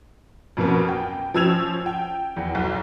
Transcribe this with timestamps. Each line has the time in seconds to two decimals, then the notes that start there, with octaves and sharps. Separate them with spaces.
0.57 F2 B2 F#3 A#3 C#4
0.88 G5
1.34 F3 C#4 E6 G#6 E7 F7
1.86 G5
2.36 E2
2.55 B1